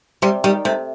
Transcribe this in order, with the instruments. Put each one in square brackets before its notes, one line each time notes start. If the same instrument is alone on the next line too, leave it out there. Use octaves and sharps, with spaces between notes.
[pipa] C3 [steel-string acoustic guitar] G3
[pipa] D#3 [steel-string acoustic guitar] G3
[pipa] C3 [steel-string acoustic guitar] A3